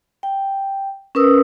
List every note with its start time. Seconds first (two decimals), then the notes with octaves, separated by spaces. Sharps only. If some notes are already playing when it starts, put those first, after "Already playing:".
0.23 G5
1.15 C#4 A#4 B4 D#6 E6